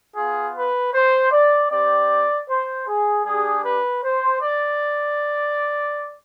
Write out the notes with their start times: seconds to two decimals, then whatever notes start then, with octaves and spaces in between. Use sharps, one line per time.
0.15 B3 F4 G#4
0.55 B4
0.93 C5
1.31 D5
1.70 C4 G4 D5
2.48 C5
2.87 G#4
3.25 G3 D4 G4 G#4
3.63 B4
4.03 C5
4.41 D5